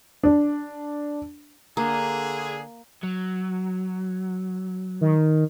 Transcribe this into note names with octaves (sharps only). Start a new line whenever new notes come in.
D4
D3 A#3 G#4
F#3
D#3